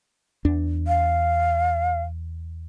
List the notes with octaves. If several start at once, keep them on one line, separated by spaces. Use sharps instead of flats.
E2 D4
F5